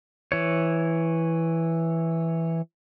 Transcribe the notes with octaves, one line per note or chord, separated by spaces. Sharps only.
E3 C#5